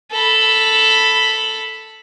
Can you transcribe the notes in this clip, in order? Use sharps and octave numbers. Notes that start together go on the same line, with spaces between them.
A4 B5